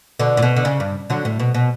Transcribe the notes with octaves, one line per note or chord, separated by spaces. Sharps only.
B2 D3
A2
B2
D3
C#3
G2
D3 F#3
A2
B2
B2